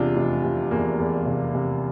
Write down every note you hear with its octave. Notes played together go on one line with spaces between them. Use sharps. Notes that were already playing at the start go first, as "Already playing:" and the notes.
Already playing: E2 C3 D4 F4
F1
C3
E2 A#3
E2
C3
C3